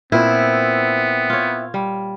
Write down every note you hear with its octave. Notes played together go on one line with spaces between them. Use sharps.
A#2 B3 C4 E4
F4 C#5
G3